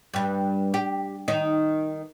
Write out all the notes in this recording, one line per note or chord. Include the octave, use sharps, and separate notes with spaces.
G2 G3
G4
D#3 D#4